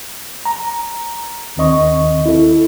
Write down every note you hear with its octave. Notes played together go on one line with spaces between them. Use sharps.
A#5
D#2 D#3 C4 D#5 C#6
E4 A4